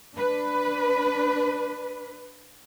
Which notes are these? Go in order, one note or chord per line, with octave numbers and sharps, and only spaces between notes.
D4 B4